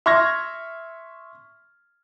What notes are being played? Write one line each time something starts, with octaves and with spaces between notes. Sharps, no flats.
E5 C6 C#6 F6 G#6 A#6